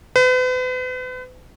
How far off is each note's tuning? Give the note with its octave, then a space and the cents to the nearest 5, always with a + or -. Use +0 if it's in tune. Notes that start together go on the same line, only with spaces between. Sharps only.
B4 +40